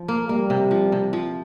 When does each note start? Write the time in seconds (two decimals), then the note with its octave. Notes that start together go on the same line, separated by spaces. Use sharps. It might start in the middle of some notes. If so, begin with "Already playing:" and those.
Already playing: F3
0.08 A#3
0.29 G3 A#3
0.50 C3
0.71 F3
0.92 C3
1.13 F3